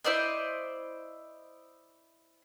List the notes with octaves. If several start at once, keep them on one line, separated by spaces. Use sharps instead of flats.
E4 C5 D5 D#5